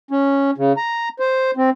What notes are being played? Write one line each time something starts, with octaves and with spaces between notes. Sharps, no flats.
C#4
C#3
A#5
C5
C4